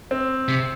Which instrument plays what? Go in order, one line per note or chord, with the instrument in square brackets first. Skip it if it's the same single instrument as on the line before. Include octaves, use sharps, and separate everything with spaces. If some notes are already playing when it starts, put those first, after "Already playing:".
[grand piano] C4
[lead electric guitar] C3